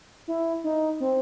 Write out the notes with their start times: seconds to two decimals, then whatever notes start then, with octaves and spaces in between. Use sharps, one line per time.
0.28 E4
0.64 D#4
1.00 C4